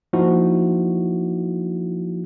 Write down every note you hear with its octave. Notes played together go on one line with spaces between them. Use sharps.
F3 A#3 D#4 E4 F#4